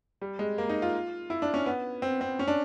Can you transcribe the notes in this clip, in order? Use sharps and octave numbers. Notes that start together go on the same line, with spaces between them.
G3
G#3
A#3
D#4
F4
E4
D4
C#4
B3
C4
C4
C#4
D4